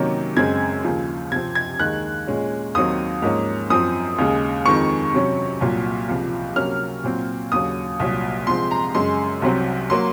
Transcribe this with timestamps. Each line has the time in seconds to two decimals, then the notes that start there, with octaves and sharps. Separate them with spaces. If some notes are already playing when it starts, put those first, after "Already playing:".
Already playing: C3 D#3 F#3 A#3 C#4
0.37 F#2 C#3 G#3 C4 G#6
0.84 D#2 C#3 F3
1.32 C3 F3 C4 G#6
1.55 G#6
1.79 D#2 D#3 G#3 F#6
2.27 A#2 G#3 C#4
2.75 D#2 D#3 F#3 C4 D#6
3.22 G#2 F3 A#3 C#4
3.70 F#2 F3 C4 D#6
4.18 D#2 C#3 G#3
4.65 F2 D#3 G#3 C4 C#6
5.13 C3 F#3 C#4
5.60 C2 A#2 F#3
6.09 C#2 C3 F3
6.56 C3 F#3 A#3 C#4 F6
7.04 A#2 F#3 C4
7.52 D#2 C#3 F#3 D#6
7.99 C2 A#2 F#3
8.47 C3 F3 G#3 C4 C6
8.71 A#5
8.95 F#2 C#3 G#3 C6
9.42 C2 C3 F#3 C4
9.90 F#3 A#3 C6